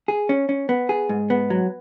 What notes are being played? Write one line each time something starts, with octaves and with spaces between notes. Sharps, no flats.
G#4
C#4
C#4
B3
G#4
G#2
B3
F#3